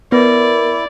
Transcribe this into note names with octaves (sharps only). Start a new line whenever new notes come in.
B3 E4 A#4 D5